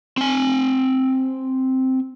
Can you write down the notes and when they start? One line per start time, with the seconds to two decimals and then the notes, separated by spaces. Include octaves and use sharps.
0.17 C4 G#5